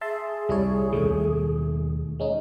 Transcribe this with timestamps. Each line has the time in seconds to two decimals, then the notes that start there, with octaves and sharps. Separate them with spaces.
0.01 G#4 E5 A5 C6
0.49 C2 G3 E4 C#5
0.92 D#2 B2 D#3 A3
2.20 G#3 C#4 D#4